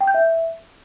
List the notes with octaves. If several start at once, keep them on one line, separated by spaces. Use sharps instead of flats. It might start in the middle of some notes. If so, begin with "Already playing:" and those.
G5
G6
E5